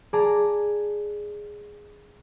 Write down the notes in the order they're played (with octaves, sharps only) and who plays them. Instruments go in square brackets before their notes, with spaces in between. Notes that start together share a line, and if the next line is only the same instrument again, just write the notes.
[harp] G#4 D5 A5 A#5